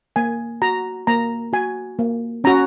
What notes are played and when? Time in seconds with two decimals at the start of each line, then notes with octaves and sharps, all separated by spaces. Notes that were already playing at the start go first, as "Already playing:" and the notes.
0.16 A#3 G#5
0.62 F#4 A#5
1.07 A#3 A#5
1.53 F#4 G#5
1.99 A#3
2.44 C#4 F#4 A#5